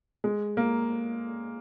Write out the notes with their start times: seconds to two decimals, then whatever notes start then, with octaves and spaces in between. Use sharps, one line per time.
0.24 G#3
0.57 A#3